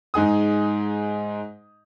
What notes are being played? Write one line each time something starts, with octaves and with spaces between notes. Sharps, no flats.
G#2 D#4 G#4 D#6